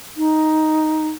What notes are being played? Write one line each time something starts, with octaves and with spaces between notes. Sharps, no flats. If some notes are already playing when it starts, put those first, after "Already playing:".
D#4